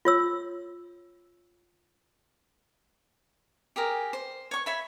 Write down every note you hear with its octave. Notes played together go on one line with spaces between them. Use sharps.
F4 C#5 E6
G4 G#4 A#4
C5
C#5 C#6
C#5 E5 B5